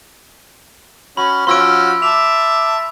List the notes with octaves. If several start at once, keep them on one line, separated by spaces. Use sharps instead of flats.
C#4 F#4 B5
F3 C#4 F#4 C6 E6 D7
E5 A5 D6 F7